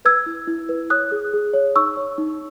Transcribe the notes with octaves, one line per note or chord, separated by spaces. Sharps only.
B4 E6 G#6
E4
E4
B4
C#5 D#6 F#6
G#4
G#4
C#5
D#4 C#6 E6
C#5
D#4